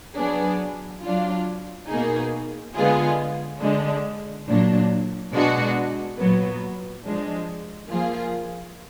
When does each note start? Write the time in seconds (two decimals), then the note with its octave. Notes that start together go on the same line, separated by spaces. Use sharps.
0.17 F#3 B3 D4 G#4
1.02 F#3 D4 F4
1.89 B2 A#3 D#4 G#4
2.74 D3 G#3 B3 F4 G#4
3.61 D3 G#3 D4
4.47 A#2 F#3 D4
5.32 B2 G#3 D4 F#4
6.18 A#2 F#3 B3
7.05 F3 G#3 D4
7.89 F3 A#3 F4 G#4